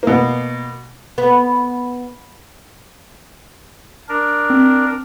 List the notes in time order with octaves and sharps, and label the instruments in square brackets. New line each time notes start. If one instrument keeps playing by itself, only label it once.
[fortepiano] B2 A#3
[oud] B3
[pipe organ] D4 A#4
[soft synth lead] C4